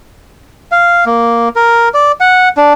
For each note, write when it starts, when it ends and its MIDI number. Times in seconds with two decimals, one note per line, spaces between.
0.72 1.05 77
1.06 1.49 58
1.56 1.89 70
1.94 2.12 74
2.20 2.49 78
2.57 2.73 62